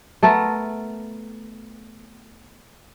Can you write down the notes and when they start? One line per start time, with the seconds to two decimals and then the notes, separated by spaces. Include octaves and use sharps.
0.23 A3 B3 A4 A#4